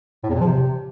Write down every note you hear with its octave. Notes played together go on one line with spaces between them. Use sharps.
A2
E2
A#2
F3
C3